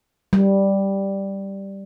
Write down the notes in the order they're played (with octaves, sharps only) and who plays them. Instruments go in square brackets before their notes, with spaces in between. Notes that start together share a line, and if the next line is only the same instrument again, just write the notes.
[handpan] G3